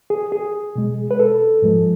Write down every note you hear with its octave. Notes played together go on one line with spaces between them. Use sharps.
G#4
G#4
B2 G#3
B4
A4
G#2 F3 G#3